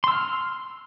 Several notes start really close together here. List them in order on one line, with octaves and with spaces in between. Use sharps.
C6 E6 F6